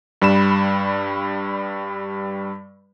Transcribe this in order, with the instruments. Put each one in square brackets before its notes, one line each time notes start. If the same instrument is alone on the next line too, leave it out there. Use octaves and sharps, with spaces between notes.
[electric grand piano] G2 G3 B5 E7